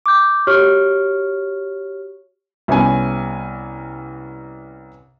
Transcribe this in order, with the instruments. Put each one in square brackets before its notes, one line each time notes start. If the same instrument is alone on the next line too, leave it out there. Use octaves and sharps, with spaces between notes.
[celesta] D6 G6
F#4 G4 C#5 C#6 F6
[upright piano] C2 B3 C#4 G#5